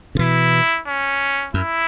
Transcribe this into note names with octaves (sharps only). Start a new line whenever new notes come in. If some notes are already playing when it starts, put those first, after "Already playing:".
C#3
B2 E3 E4
C#4
F#2 E4